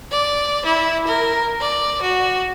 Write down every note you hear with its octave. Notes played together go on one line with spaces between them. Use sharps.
D5
E4
A#4
D5
F#4